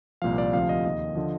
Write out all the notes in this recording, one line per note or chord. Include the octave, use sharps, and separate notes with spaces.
C2 A#2 F3 F5
D5
D2 C3 F3 F5
D#5
D#2 D#3 D#5
D3 F3